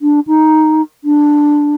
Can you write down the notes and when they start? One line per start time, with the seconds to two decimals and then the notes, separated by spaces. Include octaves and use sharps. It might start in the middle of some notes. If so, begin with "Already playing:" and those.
0.02 D4
0.27 D#4
1.04 D4